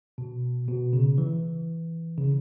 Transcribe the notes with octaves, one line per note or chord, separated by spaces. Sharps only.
B2
B2
C#3
E3
C#3